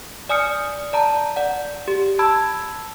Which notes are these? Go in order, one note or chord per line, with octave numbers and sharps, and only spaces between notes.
D5 G#5 D#6 F6 C#7
D5 A5 A#5
D5 F#5
G4
A5 B5 E6 G#6